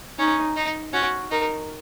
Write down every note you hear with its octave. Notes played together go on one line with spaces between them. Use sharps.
C#4 D#4
D#4
C#4 F#4
D#4 A#4